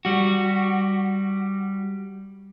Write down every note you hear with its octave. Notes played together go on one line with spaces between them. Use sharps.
G3 F#4